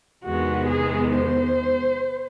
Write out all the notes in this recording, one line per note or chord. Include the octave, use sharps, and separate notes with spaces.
E2 C3 D#3 G#3 B3 F#4
G#4
C5